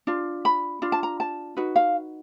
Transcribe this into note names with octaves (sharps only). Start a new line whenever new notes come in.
D4 F4
B5
D4 F4
A5
A#5
A5
D#4 F#4 B4
F5